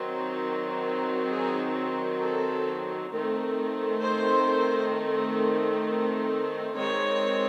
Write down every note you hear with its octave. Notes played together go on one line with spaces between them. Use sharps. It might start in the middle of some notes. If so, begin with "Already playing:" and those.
Already playing: D#3 F#3 C4
G#4
A4
D#3 A3 C4
C5
D#3 G#3 C4 C#5